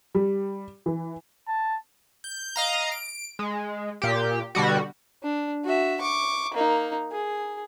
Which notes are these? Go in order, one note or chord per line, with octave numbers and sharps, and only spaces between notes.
G3
E3
A5
G6
D#5 F5 A#5
D7
G#3
A#2 G4
B2 D3 G3 F#4
D4
F#4 E5
C#6 D6
A#3 D#4
G#4